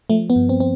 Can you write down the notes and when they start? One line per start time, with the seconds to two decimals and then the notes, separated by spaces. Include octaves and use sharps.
0.10 F3 A3
0.30 B3
0.36 G2
0.49 C4
0.60 C4